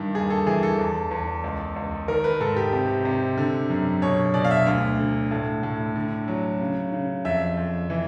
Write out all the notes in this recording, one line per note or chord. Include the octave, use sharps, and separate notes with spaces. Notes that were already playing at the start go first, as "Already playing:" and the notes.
Already playing: G2 D#3
D#2 G#4
A4
E3 G#4
A4
E2
E2
C#2
C#2
D#3 A#4
B4
G#2 A4
G4
C3
C3
D3
F#2
B2 C#5
B2 D5
F5
E5
D2 F5
D3
A2
A2
D3
F#3
C#3
C#3
F2 E5
F2
E3